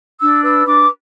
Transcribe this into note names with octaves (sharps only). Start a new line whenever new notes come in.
D4 E6
B4 E6
D4 D6